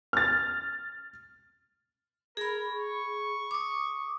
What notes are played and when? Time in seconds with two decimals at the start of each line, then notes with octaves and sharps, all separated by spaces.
0.13 F6 A6
2.37 G#4 A#4 B5
2.67 C#6
3.51 D6 D#6